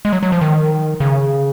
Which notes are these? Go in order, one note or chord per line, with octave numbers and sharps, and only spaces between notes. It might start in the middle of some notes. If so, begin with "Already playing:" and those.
G#3
F#3
F#3
F3
D#3
C#3